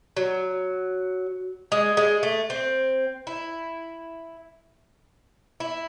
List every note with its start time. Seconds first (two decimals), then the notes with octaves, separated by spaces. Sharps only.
0.17 F#3
1.72 G#3
1.97 G#3
2.23 A3
2.50 C4
3.27 E4
5.60 E4